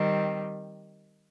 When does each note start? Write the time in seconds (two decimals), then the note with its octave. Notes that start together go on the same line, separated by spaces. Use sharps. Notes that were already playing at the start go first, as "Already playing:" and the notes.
Already playing: D#3 G3 C4